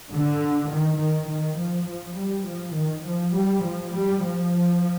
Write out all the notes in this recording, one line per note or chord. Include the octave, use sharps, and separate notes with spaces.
D3
D#3
D#3
D#3
F3
F3
G3
F3
D#3
F3
G3
F3
G3
F3